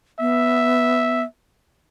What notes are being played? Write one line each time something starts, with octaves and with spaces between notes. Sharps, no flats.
B3 E5